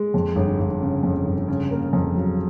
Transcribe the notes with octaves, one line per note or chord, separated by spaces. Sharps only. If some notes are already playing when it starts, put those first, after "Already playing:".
Already playing: G#3
F2
G1
G1
C#3
F2
G1
C#3
A#3
F2
F#3